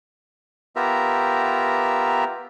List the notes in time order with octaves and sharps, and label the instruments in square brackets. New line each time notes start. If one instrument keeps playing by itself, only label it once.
[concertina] B3 F4 G4 A#4 E5 A#5